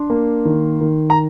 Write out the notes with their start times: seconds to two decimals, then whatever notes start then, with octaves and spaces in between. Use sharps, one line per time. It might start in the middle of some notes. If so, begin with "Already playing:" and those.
Already playing: D4 C6
0.10 A#3
0.45 D#3
0.81 D#3
1.10 A#5